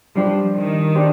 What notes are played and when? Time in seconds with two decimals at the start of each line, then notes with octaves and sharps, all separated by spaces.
0.15 F3 G3 D4 G4 C5
0.55 D#3
0.95 D4 G4 C5